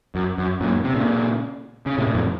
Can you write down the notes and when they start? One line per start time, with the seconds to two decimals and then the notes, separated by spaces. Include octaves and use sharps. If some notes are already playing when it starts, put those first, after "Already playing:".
0.15 F#2
0.38 F#2
0.60 F#2 A#2
0.84 C3
0.95 A#2 C#3
1.86 C#3
1.98 A2 C3
2.07 A#2
2.14 F2 A2